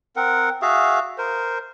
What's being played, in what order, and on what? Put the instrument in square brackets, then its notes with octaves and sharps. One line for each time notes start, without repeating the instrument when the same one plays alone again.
[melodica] C4 A#4 F#5
F#4 G#4 E5 F5
A#4 C5